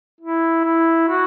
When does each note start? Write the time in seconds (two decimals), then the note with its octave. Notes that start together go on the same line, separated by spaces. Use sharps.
0.21 E4
0.65 E4
1.08 F#4